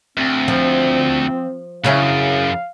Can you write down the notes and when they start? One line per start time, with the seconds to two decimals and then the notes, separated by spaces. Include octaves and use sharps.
0.18 D2 C4
0.48 F3
1.84 F#2 C#3 C#4 E4 F5